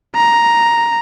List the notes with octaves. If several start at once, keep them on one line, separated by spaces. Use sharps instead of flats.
A#5